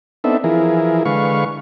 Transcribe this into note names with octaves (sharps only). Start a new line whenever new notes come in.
B3 C4 D4 D#4 A4 E5
E3 F3 E4 G#4 A#4
D3 G#3 B4 F5 C#6